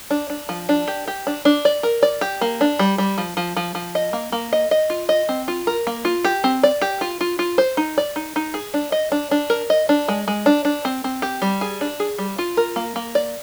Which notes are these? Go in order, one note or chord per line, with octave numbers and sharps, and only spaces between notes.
D4
D4
F3
D4
G4
G4
D4
D4
D5
A#4
D5
G4
A#3
D4
G3
G3
F3
F3
F3
F3
D#5
A#3
A#3
D#5
D#5
F4
D#5
C4
F4
A#4
A#3
F4
G4
C4
D5
G4
F4
F4
F4
C5
D#4
D5
D#4
D#4
G#4
D4
D#5
D4
D4
A#4
D#5
D4
G#3
G#3
D4
D4
C4
C4
G4
G3
G#4
D4
G#4
G3
F4
A#4
A#3
A#3
D5